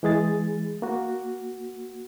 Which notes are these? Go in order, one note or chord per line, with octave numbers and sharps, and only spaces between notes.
E3 G#3 G#4 A6
A#3 F#4